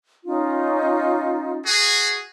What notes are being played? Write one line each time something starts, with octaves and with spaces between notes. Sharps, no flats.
C#4 D#4 F4
F#4 G#4